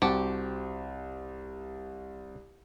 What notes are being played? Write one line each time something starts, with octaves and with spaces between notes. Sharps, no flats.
C2 C4 F#4 G4 A5